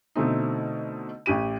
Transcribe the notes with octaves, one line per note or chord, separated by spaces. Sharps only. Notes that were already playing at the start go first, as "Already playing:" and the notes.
B2 D3 A3 C4 D#4
A1 G4 D#7